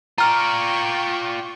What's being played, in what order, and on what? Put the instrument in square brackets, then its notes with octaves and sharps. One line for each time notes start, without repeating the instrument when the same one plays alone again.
[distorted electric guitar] F4 D5 [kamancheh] G5 C#6 [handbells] A#5 F6